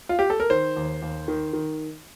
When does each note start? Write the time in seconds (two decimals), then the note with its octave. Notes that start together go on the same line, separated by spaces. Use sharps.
0.09 F4
0.19 G4
0.30 A4
0.40 A#4
0.50 D#3 C5
0.77 D#2
1.02 D#2
1.28 D#3
1.53 D#3